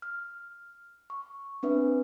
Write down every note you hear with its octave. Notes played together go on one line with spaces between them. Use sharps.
F6
C#6
C4 D4 B4 E5